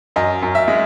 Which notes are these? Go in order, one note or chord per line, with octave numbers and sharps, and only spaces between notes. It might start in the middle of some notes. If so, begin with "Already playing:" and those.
F#2 D#5
F#2
E5
G#3